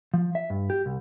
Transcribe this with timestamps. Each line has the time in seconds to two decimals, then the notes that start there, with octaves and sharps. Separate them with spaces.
0.14 F3
0.35 E5
0.50 G2
0.70 G4
0.86 C2